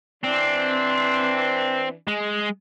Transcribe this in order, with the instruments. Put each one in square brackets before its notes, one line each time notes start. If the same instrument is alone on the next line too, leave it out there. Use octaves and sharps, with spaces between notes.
[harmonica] E3 D4 [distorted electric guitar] C4
[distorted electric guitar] G#3